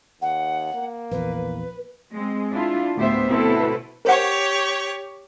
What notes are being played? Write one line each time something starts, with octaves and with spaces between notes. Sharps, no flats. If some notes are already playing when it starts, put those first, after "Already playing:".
D#2 F#5
A#3
A#1 E2 B4
G#3 C4
D4 E4 F4
D2 A2 B3 G4 C5 E5
B2 C4 E4 A4 B4
G4 A#4 C5 C#5 F#5